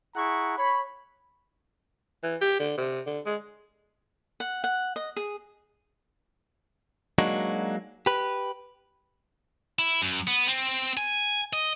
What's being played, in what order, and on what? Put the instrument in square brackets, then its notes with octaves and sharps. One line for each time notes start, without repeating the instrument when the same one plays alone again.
[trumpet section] E4 G#4 F#5 A#5 C#6
C#5 B5
[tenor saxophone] E3
G4
D3
C3
D3
G#3
[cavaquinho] F#5
F#5
D#5
G#4
[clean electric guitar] F#3 G#3 A#3 D4 D#4 F#4
G4 B4
[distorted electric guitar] E4
F#2
B3
C4
G#5
D#5